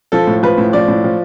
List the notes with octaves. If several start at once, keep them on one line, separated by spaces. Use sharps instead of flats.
F3 A4
A2
F3 B4
A2
F3 D5
A2
F3